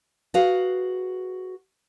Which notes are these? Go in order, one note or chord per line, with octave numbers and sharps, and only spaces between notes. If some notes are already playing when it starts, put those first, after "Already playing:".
F#4 G#4 B4 F5